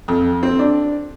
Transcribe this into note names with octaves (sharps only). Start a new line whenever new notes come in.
F2
C4
D4